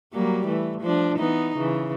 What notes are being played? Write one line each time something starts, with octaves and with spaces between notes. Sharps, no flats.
F#3 G3 A#3
E3 A3
F3 D4
E3 B3 D#4
C#3 E3